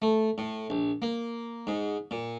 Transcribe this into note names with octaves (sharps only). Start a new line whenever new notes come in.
A3
A2
A#1
A#3
G#2
A#2